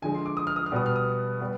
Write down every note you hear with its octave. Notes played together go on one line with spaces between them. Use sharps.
D3 F3 G#3 G#5
C6
D6
D#6
F6
D#6
F6
B2 G3 B3 D#6
F6
D#6
G3 B3